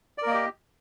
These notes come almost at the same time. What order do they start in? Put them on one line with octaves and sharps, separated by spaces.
D5 A#4 A#3 D#5 G4